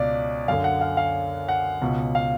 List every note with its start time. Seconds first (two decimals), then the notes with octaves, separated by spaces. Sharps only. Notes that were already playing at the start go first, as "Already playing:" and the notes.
Already playing: C#2 B2 D5
0.48 F#2 D3 F5
0.64 F#5
0.81 F5
0.97 F5
1.49 F#5
1.82 C#2 B2
2.15 F5